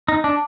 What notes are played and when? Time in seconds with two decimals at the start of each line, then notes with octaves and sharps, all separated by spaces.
0.08 D#4
0.24 D4